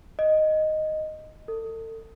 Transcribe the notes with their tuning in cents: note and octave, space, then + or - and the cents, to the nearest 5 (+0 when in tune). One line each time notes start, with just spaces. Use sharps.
D#5 -5
A4 +35